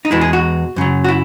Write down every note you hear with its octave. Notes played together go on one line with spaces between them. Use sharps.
D#4
E2 B2 G#3 E4
G#4
F#4
F#2 C#3 F#3
F#4
E4